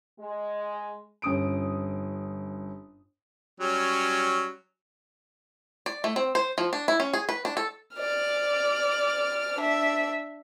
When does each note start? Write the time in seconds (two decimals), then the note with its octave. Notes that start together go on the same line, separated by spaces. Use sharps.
0.20 G#3
1.22 G1 C#4 D#6 D7
3.60 F#3 G3 C#4
5.86 D5
6.04 A3
6.16 C4
6.35 C5
6.58 F3
6.73 D4
6.88 E4
7.00 C#4
7.13 G#4
7.29 B4
7.45 D4
7.57 A4
7.96 D5 F6
9.59 D4 E5